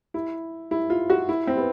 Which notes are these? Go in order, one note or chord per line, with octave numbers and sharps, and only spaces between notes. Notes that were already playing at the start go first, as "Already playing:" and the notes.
E4
E4
F4
F#4
E4
C4
B3